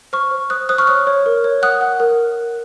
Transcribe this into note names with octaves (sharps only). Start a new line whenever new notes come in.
C5 C#6 F6
C5
C5 D#6 F#6
C5 D#6 F#6
C#6 F6
C#5 D#6 F#6
C#5
A#4
C#5
F#5 D#6 F#6
F#5
A#4